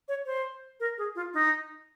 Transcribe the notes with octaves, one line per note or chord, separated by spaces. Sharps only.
C#5
C5
A#4
G#4
F4
D#4